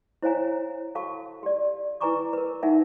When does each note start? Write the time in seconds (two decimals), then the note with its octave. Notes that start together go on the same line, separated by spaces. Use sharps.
0.22 E4 C5 C#5 F5 G#5 A#5
0.95 F#4 A4 F5 A5 C#6
1.43 G4 D5
2.01 E4 B4 G#5 A#5 C#6 D6
2.33 A#4 B4
2.62 D#4 A#4 E5 F#5 G#5